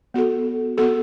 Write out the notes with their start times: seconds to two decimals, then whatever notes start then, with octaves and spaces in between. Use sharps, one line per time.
0.14 B3 F#4 A4
0.78 B3 F#4 A4